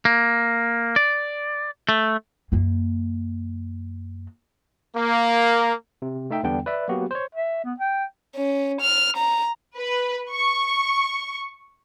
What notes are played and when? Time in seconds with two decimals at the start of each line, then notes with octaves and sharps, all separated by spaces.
0.05 A#3
0.96 D5
1.89 A3
2.52 F#2 A#3
4.95 A#3
6.02 C3
6.30 A3 D#4 E5 G5
6.43 E2 D3 G3 B3 D4 G5
6.66 B4 D5 E5
6.88 F#3 A#3 B3 F#4 G4
7.11 C5 C#5
7.35 E5
7.64 B3
7.80 G5
8.35 C#4
8.81 F6
9.17 A#5
9.76 B4
10.30 C#6